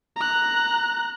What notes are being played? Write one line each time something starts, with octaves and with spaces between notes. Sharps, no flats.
A#5 F#6